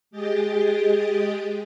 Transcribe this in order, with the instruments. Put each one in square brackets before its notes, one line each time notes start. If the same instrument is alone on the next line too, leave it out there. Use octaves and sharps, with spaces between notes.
[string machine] G#3 G4 G#4 D#5 G5 A6